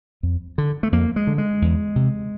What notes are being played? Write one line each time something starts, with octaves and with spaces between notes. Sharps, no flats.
F2
D3
A3
F2 A#3
G#3
D3
G#3
E2
C3